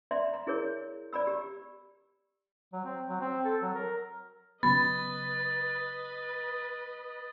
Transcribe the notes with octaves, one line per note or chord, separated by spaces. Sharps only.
D5 E5 A#5 C6
A#5
E4 G#4 A#4 C#5
D5 A#5 B5 E6
G4
F#3
C4
F#3
C4
A4
F#3
A#4
C#3 F#3 B3 B4 D#5 B5 A6